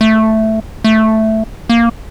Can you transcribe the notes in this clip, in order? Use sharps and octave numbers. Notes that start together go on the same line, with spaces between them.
A3
A3
A#3